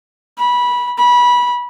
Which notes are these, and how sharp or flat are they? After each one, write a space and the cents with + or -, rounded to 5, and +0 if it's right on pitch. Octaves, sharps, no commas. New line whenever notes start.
B5 -20
B5 -20